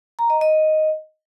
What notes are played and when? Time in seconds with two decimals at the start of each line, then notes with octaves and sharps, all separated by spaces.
0.19 A#5
0.30 D#5
0.41 D#5